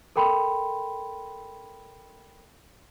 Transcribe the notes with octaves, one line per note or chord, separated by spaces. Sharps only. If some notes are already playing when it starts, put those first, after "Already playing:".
A4 A#4 G5 B5 C6